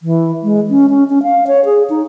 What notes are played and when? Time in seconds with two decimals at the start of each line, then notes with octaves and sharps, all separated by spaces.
0.01 E3
0.43 G#3
0.70 C#4
0.89 C#4
1.10 C#4
1.23 F5
1.47 C#5
1.65 G#4
1.90 D#4